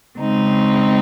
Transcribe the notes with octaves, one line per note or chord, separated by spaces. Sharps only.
C#3 G#3 C4 D#4